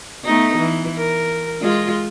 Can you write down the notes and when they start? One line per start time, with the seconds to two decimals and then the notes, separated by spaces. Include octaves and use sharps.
0.25 A3 B3 D#4
0.57 E3
0.96 A#4
1.61 G#3 F4